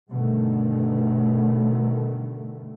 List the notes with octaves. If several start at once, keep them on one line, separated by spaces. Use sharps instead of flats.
G2 B2 D3 D#3 A3